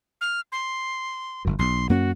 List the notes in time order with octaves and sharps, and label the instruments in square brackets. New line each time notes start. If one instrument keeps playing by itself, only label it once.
[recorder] F6
C6
[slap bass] G1 F#2
[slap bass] B1 [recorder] C6
[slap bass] F#2 A#3 C#4 [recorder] F#4